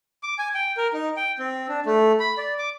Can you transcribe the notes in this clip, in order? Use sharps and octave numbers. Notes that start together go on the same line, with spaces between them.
D6
G#5
G5
A#4
D#4
G5
C4
D4
A3
B5
D5
D6